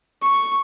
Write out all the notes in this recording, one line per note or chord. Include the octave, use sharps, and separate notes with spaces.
C#6